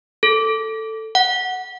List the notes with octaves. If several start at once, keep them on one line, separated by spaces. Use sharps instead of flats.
A4
F#5